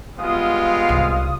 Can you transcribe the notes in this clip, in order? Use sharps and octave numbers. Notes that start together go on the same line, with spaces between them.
G3 G#3 B3 F4 F5 D#6
C2